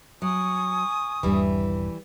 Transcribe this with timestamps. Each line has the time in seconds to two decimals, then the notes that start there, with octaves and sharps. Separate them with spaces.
0.22 F#3 G#5 C#6 D#6
1.23 D#1 G2 E3 G3